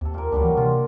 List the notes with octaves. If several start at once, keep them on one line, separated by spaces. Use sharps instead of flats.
D#2 C3 A4
A#2 A#4
D2 F#3 G3 D4
E3
C3 F4